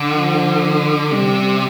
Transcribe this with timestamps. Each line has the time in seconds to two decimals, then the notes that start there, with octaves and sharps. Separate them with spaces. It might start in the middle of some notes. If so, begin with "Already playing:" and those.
Already playing: D3
0.14 F3
1.12 C3 G3